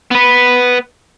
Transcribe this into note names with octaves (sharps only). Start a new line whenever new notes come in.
B3 B4